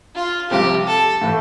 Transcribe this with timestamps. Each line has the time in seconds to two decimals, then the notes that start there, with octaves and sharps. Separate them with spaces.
0.15 F4
0.50 C2 C3 F3 G4
0.86 A4
1.21 A2 E3 A3